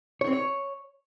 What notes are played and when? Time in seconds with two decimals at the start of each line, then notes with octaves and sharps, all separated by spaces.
0.21 C#5
0.27 C4
0.33 C#5